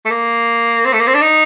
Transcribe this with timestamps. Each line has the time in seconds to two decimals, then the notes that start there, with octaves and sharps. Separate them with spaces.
0.05 A3
0.11 A#3
0.85 C4
0.93 A3
1.00 A#3
1.07 C4
1.15 D4
1.22 D#4